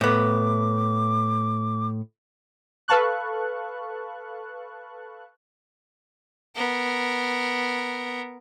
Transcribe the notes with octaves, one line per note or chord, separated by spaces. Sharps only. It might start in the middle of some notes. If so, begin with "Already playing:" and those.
A2 B3 D6
A4 B4 F5 A5 C#6 F#6
B3 A#4